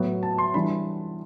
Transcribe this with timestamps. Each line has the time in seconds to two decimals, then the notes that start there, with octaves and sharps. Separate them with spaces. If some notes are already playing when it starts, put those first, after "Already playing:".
Already playing: A2 F#3 B3
0.23 A5
0.38 C6
0.54 E3 G3 D4 B5